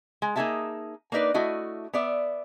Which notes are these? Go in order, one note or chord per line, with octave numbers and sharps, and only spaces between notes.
G#3
A#3 D#4 G4 G#4 E5 A5
A#3 D4 D#4 B4 D5
A3 E4 F#4 D#5
B3 D5 E5